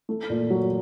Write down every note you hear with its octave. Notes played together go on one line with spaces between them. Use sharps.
A3
A#2
F#3